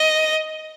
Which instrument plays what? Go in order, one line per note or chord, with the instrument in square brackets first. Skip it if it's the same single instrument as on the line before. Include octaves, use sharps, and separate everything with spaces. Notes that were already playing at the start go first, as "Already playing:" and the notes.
Already playing: [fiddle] D#5